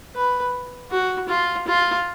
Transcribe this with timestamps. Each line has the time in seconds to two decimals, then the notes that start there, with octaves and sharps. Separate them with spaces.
0.15 B4
0.91 F#4
1.29 F4
1.68 F4